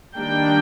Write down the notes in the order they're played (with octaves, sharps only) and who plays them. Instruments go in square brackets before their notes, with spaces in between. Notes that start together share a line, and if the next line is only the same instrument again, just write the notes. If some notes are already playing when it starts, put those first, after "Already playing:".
[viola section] D#3 G3 A#3 D4 G5